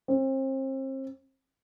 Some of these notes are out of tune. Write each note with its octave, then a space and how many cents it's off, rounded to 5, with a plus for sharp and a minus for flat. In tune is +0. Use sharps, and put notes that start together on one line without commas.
C4 +35